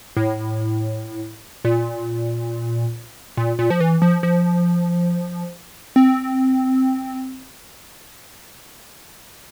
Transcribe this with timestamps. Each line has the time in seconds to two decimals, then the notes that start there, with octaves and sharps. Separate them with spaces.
0.17 A2
1.65 A#2
3.37 A#2
3.59 A#2
3.70 F3
3.80 E3
4.02 F3
4.23 F3
5.96 C4